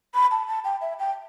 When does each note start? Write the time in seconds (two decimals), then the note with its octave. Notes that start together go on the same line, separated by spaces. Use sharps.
0.15 B5
0.31 A5
0.48 A5
0.64 G5
0.81 E5
0.99 G5